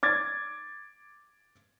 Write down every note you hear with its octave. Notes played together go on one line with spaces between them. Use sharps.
D6 G#6 A6